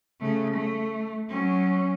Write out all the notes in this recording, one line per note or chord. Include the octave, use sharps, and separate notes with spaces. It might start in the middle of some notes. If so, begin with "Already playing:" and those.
C#3 A3
A3
F#3 C#4